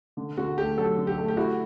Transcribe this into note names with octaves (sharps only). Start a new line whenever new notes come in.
D3
D3 F#4
A3 G4
F#3 A4
D3
G4
A3
G4
E4 F#4